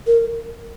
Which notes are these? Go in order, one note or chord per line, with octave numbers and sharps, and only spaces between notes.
A#4